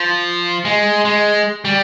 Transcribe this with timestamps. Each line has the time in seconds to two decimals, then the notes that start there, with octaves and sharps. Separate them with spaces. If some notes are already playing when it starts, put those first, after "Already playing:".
Already playing: F3
0.65 G#3
1.05 G#3
1.65 G3